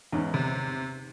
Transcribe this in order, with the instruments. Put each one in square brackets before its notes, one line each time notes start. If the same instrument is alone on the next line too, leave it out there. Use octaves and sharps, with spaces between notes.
[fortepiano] E2 G#2 C#4
[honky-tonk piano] C3